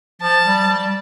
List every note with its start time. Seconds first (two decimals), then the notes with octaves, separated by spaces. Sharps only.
0.21 F3 A5
0.45 G3
0.69 G3